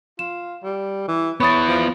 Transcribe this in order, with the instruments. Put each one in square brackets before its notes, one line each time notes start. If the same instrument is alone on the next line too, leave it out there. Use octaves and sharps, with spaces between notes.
[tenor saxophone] F4 [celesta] E7
[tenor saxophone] G3
E3
[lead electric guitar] B3 E4 [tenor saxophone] C#5 [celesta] B5 D#6 A6
[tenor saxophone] F3